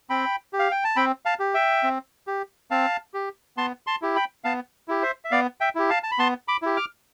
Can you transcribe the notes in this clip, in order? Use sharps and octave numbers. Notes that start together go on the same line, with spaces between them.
C4 G5 B5
G4
F5
G5
A5
C4 G5 B5
F5 A5
G4
E5 G5
C4
G4
C4 F5 A5
G4
B3 A5 C6
A5 C6
E4 G4
G5 B5
B3 F5 A5
E4 G4
C5 E5
E5
B3 D5 F5
E5 G5
E4 G4
F5 A5
A5
B5
B3 A5 C6
B5 D6
E4 G4
D6 F6